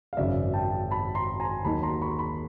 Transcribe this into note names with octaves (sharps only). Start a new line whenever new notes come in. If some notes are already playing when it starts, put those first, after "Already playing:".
F5
G#1 F#2 C#3 D5 E5
G5 A5
A5 B5
A#5 C6
G#5 A#5
D#2 D#3 F#3 A#3 D#4 A5 B5
A#5 C6
B5 C#6
B5 C#6